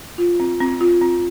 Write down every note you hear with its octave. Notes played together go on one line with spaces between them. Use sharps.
F4
C4
C4
F4
C4